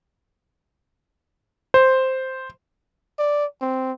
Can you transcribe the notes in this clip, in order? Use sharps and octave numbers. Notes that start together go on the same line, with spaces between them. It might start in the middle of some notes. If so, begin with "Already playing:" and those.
C5
D5
C4